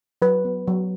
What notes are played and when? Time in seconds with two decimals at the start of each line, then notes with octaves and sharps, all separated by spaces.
0.22 F#3 B4
0.45 B3
0.67 F#3